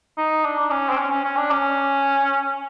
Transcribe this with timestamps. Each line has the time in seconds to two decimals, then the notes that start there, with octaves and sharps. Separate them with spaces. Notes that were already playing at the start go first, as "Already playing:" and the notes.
0.18 D#4
0.45 D4
0.59 D4
0.71 C#4
0.89 C4
0.97 C#4
1.10 C#4
1.24 C#4
1.37 D4
1.51 C#4